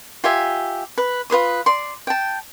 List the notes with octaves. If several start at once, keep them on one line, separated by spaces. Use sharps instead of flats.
F4 G4 E5 G#5
B4
F4 B4 C5 D#6
D5 C6
G5 A5